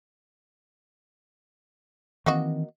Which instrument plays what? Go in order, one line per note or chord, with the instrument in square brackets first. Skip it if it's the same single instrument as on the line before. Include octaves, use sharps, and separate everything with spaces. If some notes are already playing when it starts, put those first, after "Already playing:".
[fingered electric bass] D#3 E3 C4 [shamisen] A#3 F#4 D#5